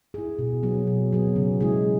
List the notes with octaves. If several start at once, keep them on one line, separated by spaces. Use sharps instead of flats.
E4 G#4
B2
F#3 B3 G#4
B2
F#3 B3 G#4
C#3
G#3 E4 G#4